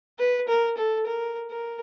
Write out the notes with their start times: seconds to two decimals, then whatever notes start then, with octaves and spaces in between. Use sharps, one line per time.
0.19 B4
0.48 A#4
0.77 A4
1.06 A#4
1.50 A#4